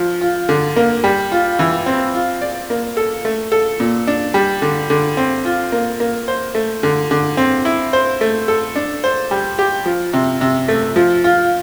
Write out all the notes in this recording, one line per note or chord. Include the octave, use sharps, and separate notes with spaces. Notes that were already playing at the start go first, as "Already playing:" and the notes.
Already playing: F3
F4
D3
A#3
G3
F4
E3
C4
F4
D5
A#3
A4
A3
A4
A#2
D4
G3
D3
D3
C4
F4
A#3
A#3
C5
A3
D3
D3
C4
E4
C5
A3
A4
D4
C5
G3
G4
F3
C3
C3
A3
F3
F4